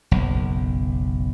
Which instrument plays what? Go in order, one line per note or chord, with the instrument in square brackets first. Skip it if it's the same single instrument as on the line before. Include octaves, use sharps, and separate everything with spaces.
[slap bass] F#1 B1